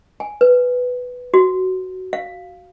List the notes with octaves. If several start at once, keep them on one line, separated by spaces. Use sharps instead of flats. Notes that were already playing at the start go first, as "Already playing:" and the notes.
G#5
B4
F#4
F5